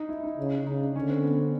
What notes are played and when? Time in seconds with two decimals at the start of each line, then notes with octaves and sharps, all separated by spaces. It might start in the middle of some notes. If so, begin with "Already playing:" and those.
Already playing: D#4
0.09 E4
0.23 D#4
0.37 C#3
0.67 C#3 D#4
0.81 D4
0.95 D3 C#4
1.10 C4
1.24 B3
1.39 C#4